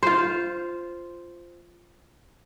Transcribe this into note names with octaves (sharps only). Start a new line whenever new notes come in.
F4 C5